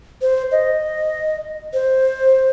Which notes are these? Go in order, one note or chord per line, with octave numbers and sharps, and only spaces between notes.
C5
D#5
C5